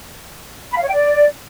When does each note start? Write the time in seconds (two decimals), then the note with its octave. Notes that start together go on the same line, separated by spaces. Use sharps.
0.72 B5
0.77 F5
0.82 C#5
0.88 G5
0.93 D5